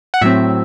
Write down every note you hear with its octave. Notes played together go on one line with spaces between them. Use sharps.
F#5
A2 F#3 C4 E5